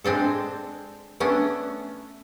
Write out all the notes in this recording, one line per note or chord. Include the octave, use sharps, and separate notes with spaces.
G#3 C4 D4 A4
A3 B3 C#4 D4